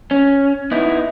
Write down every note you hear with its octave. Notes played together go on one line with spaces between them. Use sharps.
C#4
B3 D#4 E4